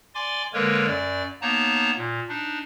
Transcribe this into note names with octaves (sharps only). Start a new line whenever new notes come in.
D5 G#5 C6 D6
D3 G#3 A#3 A#4 B4 C#5
F#2 D5
A#3 B3 D#4 C#5 A5 A#5
A#2
D4 D#4